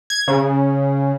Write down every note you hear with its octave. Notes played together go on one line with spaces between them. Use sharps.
G#6
C#3